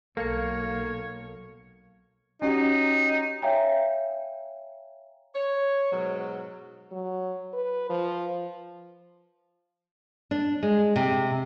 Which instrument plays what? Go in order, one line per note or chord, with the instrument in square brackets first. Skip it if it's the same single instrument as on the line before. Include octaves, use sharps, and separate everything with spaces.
[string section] B1 [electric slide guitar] A#3 [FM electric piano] A4 F5 C#7 [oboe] C#5
[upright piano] C#4 F#4 G4 [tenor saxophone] D#4
[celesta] C#5 E5 F5 G5 G#5 A#5
[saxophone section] C#5
G#2 B2 F#3
[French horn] F#3
B4
F3
[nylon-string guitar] D4
G#3
C3